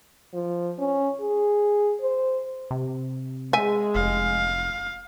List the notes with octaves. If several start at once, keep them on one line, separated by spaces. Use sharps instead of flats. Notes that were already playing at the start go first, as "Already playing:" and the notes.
F3
C#4
G#4
C5
C3
G#3 E5 G#5
F1 F5